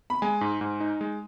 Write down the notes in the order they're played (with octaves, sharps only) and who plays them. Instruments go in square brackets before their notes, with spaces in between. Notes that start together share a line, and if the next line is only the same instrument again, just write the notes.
[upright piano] B5
[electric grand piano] G#3 [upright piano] G#5
[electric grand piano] G#2
G#2
D#4
G#3